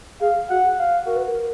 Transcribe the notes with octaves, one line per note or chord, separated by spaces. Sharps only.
G#4 F5
F#4 F#5
F5
F#4 A#4
B4
A#4